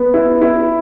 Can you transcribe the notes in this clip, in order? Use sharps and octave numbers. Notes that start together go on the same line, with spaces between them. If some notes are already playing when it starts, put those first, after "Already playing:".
Already playing: B3
E4
E4